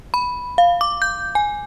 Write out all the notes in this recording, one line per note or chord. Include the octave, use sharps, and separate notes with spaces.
B5
F5
D6
G6
G#5